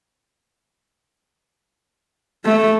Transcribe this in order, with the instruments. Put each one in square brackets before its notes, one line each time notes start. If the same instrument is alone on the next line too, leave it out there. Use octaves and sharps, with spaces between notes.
[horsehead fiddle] A3